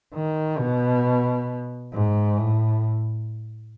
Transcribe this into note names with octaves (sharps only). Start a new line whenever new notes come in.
D#3
B2
G#2
A2